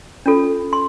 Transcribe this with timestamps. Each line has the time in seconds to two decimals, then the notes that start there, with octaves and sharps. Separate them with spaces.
0.26 C#4 F4 A4
0.73 C6